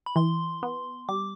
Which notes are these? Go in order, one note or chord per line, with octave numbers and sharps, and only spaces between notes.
B5
E3 C6
B3
G3 D6